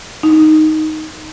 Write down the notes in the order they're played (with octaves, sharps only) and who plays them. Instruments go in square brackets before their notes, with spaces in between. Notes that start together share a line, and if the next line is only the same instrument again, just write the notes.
[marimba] D#4